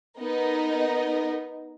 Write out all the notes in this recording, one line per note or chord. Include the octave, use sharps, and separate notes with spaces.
B3 D#4 A#4 D#5